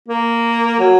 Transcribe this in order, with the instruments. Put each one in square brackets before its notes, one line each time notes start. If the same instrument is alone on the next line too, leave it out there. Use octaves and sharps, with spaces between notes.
[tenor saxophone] A#3
F#3